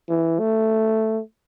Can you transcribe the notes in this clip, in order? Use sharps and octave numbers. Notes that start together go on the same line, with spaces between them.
E3
A3